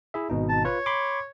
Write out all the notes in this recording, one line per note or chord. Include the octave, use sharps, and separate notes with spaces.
E4 G#4 E5
G#1 B2 D#4
A5
F4 B4 C#5
B5 C6 D6